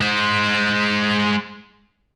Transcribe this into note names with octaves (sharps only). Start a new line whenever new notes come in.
G#3 C5